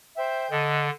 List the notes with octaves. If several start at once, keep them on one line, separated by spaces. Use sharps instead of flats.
C5 E5 G5
D3 A4 D#5